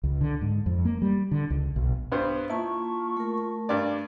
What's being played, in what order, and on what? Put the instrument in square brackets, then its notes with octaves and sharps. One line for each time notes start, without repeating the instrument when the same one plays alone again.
[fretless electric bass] C#2
D3
G#2
F2
A#3
G3
D3
C#2
B1
[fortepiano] G2 B3 C5
[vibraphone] A#3 A5 [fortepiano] E4 [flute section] F4 C#6
[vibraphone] A3 A#4
[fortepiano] G2 D5